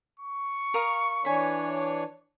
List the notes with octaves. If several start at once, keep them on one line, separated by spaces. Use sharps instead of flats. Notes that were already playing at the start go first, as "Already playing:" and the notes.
C#6
A#4 F5 D#6
E3 D4 C#5 G#5 B5